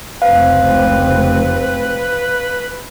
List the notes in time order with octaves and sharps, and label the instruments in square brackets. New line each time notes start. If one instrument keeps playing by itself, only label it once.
[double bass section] F1 C#2 C4 [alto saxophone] B4 [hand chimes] F5